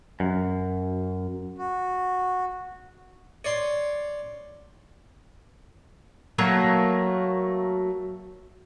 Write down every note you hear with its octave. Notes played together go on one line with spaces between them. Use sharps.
F#2
F#4
C#5 D5 C6
F#3 A3 A#3